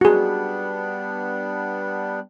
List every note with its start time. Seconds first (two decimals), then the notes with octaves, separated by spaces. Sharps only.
0.01 G3 B3 D4 F#4 G#4